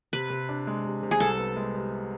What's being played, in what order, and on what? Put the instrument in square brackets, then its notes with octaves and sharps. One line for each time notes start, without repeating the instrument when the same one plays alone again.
[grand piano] C3 [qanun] B4
[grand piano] C3
D4
G#3
C3
C3
[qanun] G#4
[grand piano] C2 [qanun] A4
[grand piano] B3
G#3
C3